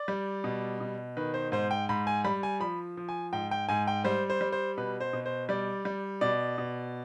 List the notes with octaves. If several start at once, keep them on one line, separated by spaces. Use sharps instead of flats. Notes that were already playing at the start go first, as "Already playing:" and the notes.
Already playing: D5
G3
B2
B2
D#3 B4
C5
G#2 C5
G5
G#2 B5
G#5
G3 B5
G#5
F3 B5
F3
G#5
G#2 G5
G5
G#2 G#5
G5
G3 C5
C5
G3
C5
B2 B4
C5
B2
C5
G3 D5
G3
B2 D5
B2